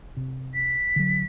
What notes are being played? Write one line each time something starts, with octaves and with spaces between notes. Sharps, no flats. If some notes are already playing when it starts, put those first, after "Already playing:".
C3
B6
D3 F#3